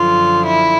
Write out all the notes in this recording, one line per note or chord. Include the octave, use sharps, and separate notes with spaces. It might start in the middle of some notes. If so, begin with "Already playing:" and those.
Already playing: F#2 D3 F3 F4
E4